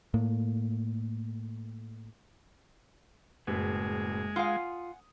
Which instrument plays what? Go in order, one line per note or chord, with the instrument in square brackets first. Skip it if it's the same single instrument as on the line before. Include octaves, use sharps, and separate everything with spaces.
[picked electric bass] A2 A#3
[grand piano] F#1 [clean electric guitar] A2 B4 [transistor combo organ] G#3
[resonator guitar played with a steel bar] F4 F5 [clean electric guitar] F#5 G#5 [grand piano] D#6